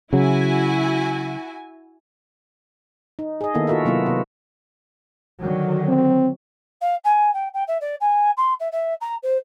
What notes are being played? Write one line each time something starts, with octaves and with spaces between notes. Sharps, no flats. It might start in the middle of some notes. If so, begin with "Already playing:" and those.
C#3 F#3 E4 F#4 G#5
D#4
G#4 D#5
D#3 A#3 B3 E4 A4
F4 F#4 A4 A#4 E5
C3 F#3 A#3 B3 E4 F4
C3 B3
D3 D#3 F#3
C4
F5
G#5
G5
G5
E5
D5
G#5
C6
E5
E5
A#5
C5